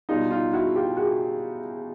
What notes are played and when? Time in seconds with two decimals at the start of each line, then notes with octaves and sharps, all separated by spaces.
0.09 B2 G3 D#4 F4
0.30 D#4 F4
0.53 E4 F#4
0.75 F4 G4
0.97 F#4 G#4